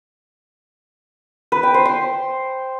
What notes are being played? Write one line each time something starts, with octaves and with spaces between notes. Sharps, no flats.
B4
G5
C5
C6